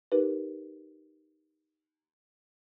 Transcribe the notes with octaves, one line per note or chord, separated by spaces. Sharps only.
D#4 G4 A#4 B4